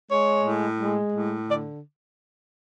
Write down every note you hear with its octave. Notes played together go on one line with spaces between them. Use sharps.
G#3 C#5
A2
G#3
A2
D3 D5